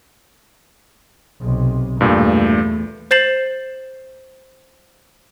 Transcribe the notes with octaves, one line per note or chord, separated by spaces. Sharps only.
B1 C3
E2 G2 A#2 A3
C5 G6 A6 C7 E7 F#7